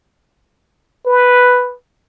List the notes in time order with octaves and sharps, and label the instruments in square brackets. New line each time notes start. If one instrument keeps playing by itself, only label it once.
[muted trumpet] B4